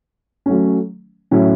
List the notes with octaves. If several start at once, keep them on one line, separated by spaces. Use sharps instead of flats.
F#3 A3 C#4
A2 F#3 C#4 E4